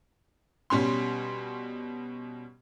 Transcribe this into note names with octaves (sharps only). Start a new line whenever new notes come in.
B2 G3 C#4 C6